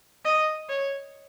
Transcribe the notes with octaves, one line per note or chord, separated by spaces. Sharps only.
D#5
C#5